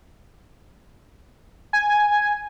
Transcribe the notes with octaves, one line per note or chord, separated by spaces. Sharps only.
G#5